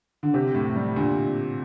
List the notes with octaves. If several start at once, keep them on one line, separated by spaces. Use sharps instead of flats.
D3
C3 G4
A2
G3
A#2 D3